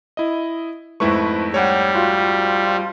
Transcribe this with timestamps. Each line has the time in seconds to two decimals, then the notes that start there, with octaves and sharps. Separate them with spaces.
0.17 E4 D#5
1.00 F2 G#2 A3 E4 B4 C#6
1.54 G3 C#5 F#5
1.95 F4 F#4